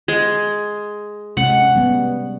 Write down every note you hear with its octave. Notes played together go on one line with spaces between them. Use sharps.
G#3
C3 G#3 C#4 F#5
G3 B3